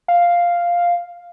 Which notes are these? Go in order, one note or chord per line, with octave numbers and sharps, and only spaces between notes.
F5